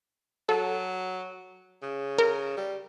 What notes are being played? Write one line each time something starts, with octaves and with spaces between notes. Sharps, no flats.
F#3 A4
C#3
A#4
G3